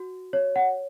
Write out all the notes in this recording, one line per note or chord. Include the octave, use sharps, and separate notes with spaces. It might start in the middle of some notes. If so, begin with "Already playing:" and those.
Already playing: F#4
C#5
F#5